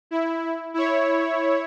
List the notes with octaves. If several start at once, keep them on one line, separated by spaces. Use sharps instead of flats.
E4
E4 C#5